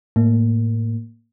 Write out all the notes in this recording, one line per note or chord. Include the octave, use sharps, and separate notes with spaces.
A2 A#3